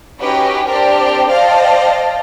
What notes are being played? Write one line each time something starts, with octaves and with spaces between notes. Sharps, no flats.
C#4 D#4 F#4 G4 B4
C4 D4 G4 A#4 C5 D5
C5 D5 D#5 F5 G5 A5